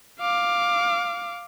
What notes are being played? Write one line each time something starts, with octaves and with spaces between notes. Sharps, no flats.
F5 D6